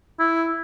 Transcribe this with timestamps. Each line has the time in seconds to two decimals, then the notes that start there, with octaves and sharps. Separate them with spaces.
0.20 E4